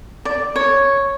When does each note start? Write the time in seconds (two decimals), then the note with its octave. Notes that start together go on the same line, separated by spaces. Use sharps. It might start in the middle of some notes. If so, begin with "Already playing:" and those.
0.25 D5
0.56 C#5